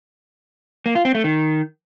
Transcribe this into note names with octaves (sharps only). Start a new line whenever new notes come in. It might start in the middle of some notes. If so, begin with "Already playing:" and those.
A#3
F4
C4
A3
D#3